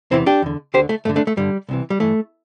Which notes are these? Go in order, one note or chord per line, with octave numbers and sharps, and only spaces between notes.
E2 C3 E3 C4 E4
D4 G4
E2 D3
D2 D3 G4 C5
A3
G2 D3 A3
A3 D4
A3
G2 D3 G3
C2 C3 E3
G3
G2 E3 A3